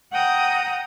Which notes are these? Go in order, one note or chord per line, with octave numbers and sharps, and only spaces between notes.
F#5 G5 A#5 D#6